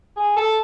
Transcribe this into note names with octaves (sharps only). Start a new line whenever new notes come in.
G#4
A4